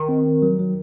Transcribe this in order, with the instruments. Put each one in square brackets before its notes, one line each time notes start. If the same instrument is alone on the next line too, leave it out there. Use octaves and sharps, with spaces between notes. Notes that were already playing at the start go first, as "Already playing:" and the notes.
Already playing: [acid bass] D#3
[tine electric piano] C4
C4
F#3
F#3